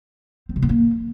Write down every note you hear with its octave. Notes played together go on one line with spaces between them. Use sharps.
C4
C3
B3
A#3